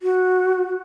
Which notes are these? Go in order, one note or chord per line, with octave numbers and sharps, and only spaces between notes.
F#4